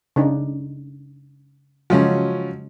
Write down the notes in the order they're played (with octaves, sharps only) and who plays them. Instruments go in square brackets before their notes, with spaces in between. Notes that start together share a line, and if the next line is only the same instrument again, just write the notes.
[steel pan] C#3 D4 D#4
[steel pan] C#3 G#3 F#4 [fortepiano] F3 F#3 C#4